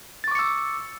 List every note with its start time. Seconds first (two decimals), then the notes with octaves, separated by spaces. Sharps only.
0.24 A6
0.28 C#6
0.31 D6
0.35 C#7
0.39 E6